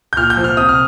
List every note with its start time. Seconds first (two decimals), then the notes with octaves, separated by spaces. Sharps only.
0.13 G6
0.17 A#2 F6
0.30 G6
0.37 F3
0.44 F6
0.57 C3 D#6
0.69 F6